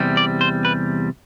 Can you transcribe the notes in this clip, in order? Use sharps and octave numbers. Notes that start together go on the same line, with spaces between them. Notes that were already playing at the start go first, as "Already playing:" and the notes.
Already playing: E2 C3 G3
D5
C5
B4